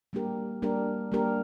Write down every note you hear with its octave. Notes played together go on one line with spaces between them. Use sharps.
G3 A#3 D4 G4 A#4
G3 A#3 D4 G4 A#4
G3 A#3 D4 G4 A#4